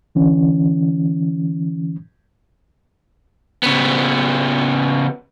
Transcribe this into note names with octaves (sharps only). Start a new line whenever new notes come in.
D3 E3 C#4
C#3 B3